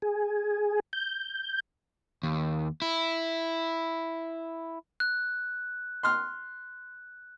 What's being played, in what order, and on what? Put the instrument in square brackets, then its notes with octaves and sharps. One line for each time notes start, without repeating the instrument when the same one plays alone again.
[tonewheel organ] G#4
G6
[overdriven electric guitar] D#2
E4
[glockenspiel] F#6
[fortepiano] C6 F6